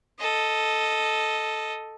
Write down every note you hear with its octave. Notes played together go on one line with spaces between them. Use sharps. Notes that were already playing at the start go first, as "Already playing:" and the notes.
A4 D#5